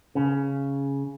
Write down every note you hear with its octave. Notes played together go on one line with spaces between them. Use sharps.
C#3